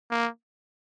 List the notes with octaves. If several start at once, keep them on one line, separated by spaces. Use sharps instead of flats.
A#3